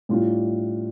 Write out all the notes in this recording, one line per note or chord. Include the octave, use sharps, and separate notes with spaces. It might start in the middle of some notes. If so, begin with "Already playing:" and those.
A2 G3 D4 F4